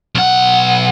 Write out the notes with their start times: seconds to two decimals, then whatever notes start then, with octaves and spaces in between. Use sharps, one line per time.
0.15 B1 F#5